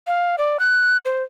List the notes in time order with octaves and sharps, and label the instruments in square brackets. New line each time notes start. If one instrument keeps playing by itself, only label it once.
[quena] F5
D5
F#6
C5